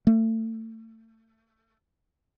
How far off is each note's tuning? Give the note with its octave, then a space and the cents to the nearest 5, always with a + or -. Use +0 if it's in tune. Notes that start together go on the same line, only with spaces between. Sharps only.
A3 +30